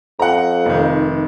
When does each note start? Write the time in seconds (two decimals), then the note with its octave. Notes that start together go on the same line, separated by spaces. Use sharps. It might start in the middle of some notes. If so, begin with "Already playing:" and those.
0.19 F2 F#5 A#5
0.65 F1 D#3